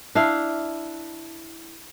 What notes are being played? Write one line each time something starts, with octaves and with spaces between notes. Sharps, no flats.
D4 E4 F5